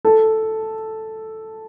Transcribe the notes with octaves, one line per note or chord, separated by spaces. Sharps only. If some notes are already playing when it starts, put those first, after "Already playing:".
A4